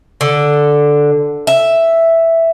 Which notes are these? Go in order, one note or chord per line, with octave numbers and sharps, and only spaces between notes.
D3
E5